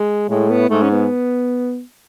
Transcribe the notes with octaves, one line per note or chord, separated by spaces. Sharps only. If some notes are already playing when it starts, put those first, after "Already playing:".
Already playing: G#3
A2 G#3
B3
G#2 A3
C#4
B3